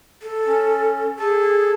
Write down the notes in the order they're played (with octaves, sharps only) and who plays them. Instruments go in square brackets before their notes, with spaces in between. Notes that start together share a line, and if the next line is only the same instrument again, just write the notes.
[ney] A4
[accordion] C#4
[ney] G#4 [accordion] A4